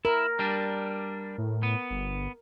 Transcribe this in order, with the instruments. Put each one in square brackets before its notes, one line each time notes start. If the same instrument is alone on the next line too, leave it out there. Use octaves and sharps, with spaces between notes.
[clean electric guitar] E4 [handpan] A#4
[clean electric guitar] G3 D4
[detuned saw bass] A2
[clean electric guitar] B3
[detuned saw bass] G1